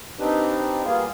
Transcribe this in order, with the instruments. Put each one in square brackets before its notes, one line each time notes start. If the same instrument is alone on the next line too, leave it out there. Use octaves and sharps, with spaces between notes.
[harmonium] C4 D4 D#4 G4 B4
G3 A#3 B3 F4 G#4